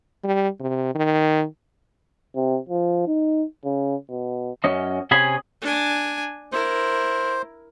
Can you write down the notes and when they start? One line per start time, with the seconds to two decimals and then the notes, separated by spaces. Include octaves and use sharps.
0.24 G3
0.60 C3
0.95 D#3
2.36 C3
2.69 F3
3.07 D#4
3.65 C#3
4.10 B2
4.64 F#2 C#4 D#5
5.11 C3 C#4 G#4 G#5 B5
5.61 D4 G#5
6.52 E4 A#4 C5